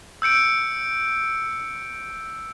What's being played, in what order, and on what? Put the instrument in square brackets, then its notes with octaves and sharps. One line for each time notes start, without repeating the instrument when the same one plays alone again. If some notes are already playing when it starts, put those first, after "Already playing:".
[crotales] E6 G6 C#7 D7